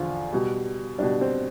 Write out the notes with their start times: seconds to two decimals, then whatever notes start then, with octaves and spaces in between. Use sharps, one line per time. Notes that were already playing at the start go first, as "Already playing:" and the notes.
Already playing: E2 D3 F3 F4
0.32 B2 G3
0.98 G3 D4
1.03 B2
1.21 C4